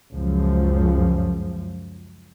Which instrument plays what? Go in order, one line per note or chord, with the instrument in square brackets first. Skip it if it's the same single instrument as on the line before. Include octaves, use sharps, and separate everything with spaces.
[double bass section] C#2 F#2 F3